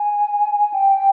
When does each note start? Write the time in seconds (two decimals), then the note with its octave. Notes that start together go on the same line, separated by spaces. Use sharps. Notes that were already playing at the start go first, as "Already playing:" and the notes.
Already playing: G#5
0.74 G5